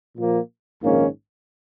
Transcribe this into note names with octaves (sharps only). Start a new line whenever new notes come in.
A#2 F3 A#3
A#1 G#2 D#3 A#3 C#4